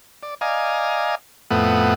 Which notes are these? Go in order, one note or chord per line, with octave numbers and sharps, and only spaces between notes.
D5
D5 D#5 F5 G#5 A#5
F2 A2 A3 B3 F#5 D#6